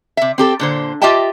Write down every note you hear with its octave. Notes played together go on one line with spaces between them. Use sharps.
C3 E5
C4 G4 A4
A#2 D3 C5
F4 G4 D#5 E5 G5 A5